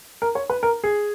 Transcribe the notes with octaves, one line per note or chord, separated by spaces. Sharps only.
A#4
C#5
B4
A#4
G#4